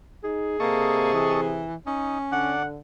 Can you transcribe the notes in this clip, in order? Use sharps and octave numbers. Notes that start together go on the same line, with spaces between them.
D#4 G#4
C3 A#3 A4 D#5 C#6
E3
C#4 D#4
D3 D4 F#5